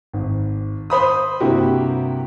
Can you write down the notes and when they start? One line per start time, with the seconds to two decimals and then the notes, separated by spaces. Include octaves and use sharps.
0.13 G#1
0.90 C5 B5 D#6
1.40 G2 C3 A#3 E4 F#4 G4